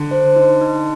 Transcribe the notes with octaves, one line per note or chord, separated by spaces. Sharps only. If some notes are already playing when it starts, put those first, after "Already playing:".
Already playing: D3
C5
D#4
D#4